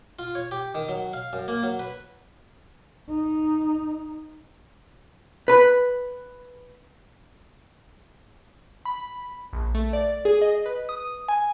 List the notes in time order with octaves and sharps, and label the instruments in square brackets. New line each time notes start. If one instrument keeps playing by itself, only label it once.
[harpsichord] F4
C#5
G4
D#3
F#3
F5
F#2
A#3
F#3
B4
[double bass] D#4
[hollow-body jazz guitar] B4 B5
[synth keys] B5
A#1
A3
D5
G#4
D#5
B4
D#6
G#5